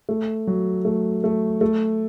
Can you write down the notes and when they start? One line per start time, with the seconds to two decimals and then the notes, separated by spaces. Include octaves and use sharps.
0.09 A3
0.47 F#3
0.85 A3
1.24 A3
1.61 A3